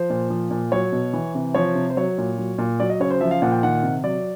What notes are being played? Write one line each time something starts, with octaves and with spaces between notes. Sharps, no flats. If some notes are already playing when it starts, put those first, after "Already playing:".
Already playing: F3 C5
A#2
F3
A#2
F#3 C#5
B2
E3
C3
F3 C#5
C3
C5
F#3 C#5
A#2
F#3
A#2
F#3 D5
D#5
C#3 C#5
C5
F3 E5
F5
A#2 F#5
G5
D#3 F#5
C3
F#3 D5